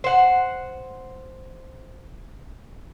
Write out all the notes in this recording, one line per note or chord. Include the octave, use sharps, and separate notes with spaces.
C5 F#5